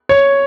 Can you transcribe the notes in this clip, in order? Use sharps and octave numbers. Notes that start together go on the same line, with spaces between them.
C#5